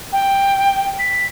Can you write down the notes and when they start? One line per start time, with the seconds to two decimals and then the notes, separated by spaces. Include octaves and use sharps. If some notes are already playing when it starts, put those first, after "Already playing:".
0.13 G5
0.99 B6